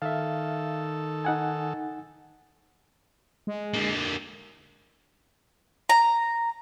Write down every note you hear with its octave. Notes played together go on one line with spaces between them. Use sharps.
D#3 A4 E5 F5
D#4 F#5 G#5
G#3
D3 A#3
A#5